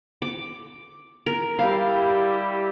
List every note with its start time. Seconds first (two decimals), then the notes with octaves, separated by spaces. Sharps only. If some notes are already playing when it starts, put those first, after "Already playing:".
0.22 D6
1.26 A#4
1.59 G3 E4 G4 F5